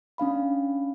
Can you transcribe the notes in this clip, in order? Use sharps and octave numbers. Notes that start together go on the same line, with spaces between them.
C#4 D4 F5 B5